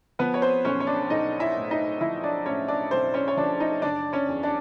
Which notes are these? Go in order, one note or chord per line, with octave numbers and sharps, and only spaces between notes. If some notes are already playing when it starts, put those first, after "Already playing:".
F3 B3 B4
C#5
C4 C5
B1 C#4 C#5
C#5
D4 D5
B1 D#4 D#5
E4 E5
A2
D#4 D#5
F3 E4 E5
D4 D5
A2 C#4 C#5
D4 D5
B1 C4 C5
C#4 C#5
C#5
F3 D4 D5
D#4 D#5
F#1 D4 D5
C#4 C#5
E2
D4 D5